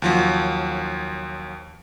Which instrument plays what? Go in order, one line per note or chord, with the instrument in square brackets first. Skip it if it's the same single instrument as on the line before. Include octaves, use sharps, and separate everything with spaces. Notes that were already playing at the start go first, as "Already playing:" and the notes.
[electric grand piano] D#2 F3 F#3